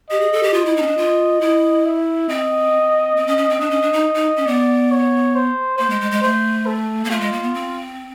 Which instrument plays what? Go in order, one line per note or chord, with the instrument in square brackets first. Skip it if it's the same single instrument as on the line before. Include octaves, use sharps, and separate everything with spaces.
[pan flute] G4 [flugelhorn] D#5
[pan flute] G#4
A4
G4
[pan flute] F4 [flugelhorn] D#5
[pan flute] E4
D#4
C#4
D4
F4
E4
[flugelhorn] E5
[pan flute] C4 [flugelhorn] D#5
[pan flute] C4
C#4
C#4
C4
[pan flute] D4 [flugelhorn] D#5
[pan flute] C#4
D4
D#4
D#4
C#4
[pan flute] B3 [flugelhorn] D5
[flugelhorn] C#5
C5
[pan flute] A#3 [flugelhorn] C5
[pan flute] G#3
G#3
G#3
[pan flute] A3 [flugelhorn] C5
[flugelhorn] A4
[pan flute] A#3
[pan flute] A3 [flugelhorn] F4
[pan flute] G#3
A#3
B3
C4